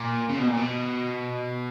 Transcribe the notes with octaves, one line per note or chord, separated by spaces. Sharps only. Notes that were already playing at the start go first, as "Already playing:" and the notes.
Already playing: A#2
C#3
B2
A#2
B2